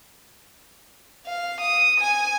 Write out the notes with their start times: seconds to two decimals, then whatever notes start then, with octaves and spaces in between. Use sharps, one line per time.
1.26 F5
1.61 D#6
2.01 G#5